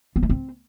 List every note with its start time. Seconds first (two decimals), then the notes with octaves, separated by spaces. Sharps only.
0.16 B3
0.23 A3
0.29 C4